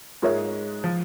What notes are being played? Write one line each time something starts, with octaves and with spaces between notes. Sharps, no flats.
G#2 G#3 F4 A#4 C#5 E5
F3